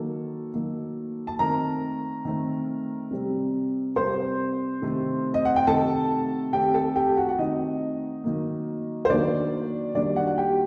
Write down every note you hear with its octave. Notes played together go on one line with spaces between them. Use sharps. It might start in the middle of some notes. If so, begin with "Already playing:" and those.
Already playing: D#3 F#3 A#3 A4
D#3 F#3 A#3
A5
D#3 A3 C4 A#4 A#5
D#3 A3 C4
C3 G3 C4
C3 G3 C4 C5 C6
C3 D#3 A3
D#5
F#5
G5
C3 D#3 A3 A4 A5
D#3 A3 C4 G4 G5
A4 A5
G4 G5
F#4 F#5
F#5
D#3 A3 C4 D#4 D#5
D#3 F#3 A#3
C5
D#3 F#3 A#3 D4 D5
D#3 G3 A#3 D4 D5
F#4 F#5
F#5
G4 G5